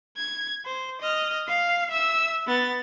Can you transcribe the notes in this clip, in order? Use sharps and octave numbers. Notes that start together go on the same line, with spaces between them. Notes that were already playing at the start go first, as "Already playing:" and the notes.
G#6
C5
D#5 F6
F5 C7
E5 E6
B3 A6